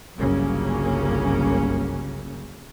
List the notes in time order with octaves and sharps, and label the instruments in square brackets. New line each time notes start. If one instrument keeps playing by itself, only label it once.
[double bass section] G1 C2 C#3 F#3 A#3 C#4